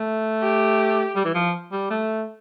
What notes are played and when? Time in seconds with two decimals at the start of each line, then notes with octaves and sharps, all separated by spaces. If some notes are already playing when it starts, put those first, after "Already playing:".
Already playing: A3
0.42 G4
1.16 G3
1.25 E3
1.35 F3
1.72 G3
1.90 A3